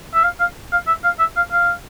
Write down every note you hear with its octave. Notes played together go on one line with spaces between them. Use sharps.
E5
F5
F5
F5
E5
F5
E5
F5
F5